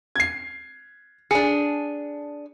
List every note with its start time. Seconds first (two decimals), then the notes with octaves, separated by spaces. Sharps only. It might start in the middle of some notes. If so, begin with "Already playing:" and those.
0.16 G#6 C7
1.31 D4 G#4 C#7